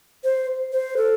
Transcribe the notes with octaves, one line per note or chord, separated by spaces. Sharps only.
C5
C5
A4